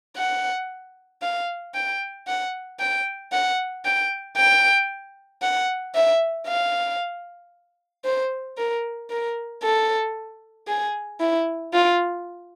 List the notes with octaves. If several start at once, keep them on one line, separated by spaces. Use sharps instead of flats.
F#5
F5
G5
F#5
G5
F#5
G5
G5
F#5
E5
F5
C5
A#4
A#4
A4
G#4
E4
F4